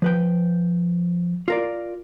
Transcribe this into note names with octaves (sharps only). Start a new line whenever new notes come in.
F3 B4 G5
F4 A#4 D5